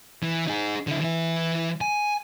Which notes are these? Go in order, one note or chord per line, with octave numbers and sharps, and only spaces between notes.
E3
D#4 G#4
D3 E4
E3 E4
G#5